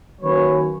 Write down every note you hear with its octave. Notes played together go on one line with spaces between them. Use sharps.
D#3 F#3 A#3 C#4 B4 C#5